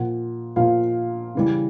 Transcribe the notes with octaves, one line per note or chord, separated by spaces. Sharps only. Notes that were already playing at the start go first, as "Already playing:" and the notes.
Already playing: A#2 F3 F#5
A#2 F3 F5
C#3 E3 G3